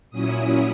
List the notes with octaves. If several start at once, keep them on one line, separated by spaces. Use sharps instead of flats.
A#2 F#3 C#4 E4 D#6